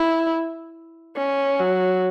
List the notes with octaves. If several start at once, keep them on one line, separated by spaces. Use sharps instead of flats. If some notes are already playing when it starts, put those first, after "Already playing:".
Already playing: E4
C#4
F#3